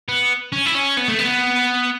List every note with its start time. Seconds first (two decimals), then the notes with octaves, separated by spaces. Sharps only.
0.08 B3
0.52 C#4
0.66 E4
0.75 C#4
0.97 B3
1.08 A3
1.19 B3